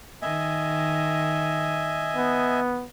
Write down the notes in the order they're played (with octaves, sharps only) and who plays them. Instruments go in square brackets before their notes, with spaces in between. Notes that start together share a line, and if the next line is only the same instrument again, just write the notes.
[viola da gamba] D#3 [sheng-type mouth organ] D#5 E5 G#5
[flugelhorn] B3